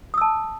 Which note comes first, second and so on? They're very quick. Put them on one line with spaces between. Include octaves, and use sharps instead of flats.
D#6 E6 A5